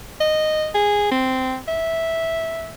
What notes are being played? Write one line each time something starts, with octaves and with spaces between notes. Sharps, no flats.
D#5
G#4
C4
E5